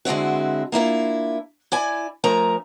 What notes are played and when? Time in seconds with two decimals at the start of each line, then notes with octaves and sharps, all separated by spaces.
0.05 D3 G#3 C4 E4 F#4
0.72 A#3 D4 E4 F4
1.72 E4 D5 G#5
2.24 F3 A3 C#4 A#4 A#5